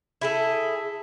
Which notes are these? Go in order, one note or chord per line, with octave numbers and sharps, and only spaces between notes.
E4 G#4 A4